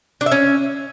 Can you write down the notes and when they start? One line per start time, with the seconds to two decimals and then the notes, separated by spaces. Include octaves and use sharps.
0.21 D4
0.26 E5
0.32 C#4